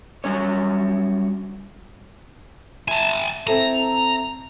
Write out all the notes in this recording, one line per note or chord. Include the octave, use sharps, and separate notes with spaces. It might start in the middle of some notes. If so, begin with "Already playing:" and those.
F#3 G3 C#4 C#5
E4 G#5 A5
C4 E4 A4 A#5